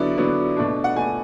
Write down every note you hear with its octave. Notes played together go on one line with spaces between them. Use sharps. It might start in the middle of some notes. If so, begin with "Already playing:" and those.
Already playing: D3 F#3 B3 E4 D5
D3 F#3 B3 E4
B2 A3 D4
F#5
B2 A3 D4 G#5